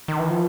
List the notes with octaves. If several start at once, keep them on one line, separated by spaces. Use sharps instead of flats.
D#3
E3
F3